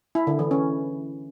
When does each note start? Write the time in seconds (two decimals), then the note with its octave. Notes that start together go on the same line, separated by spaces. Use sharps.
0.15 E4
0.27 D3
0.39 E3
0.51 C#4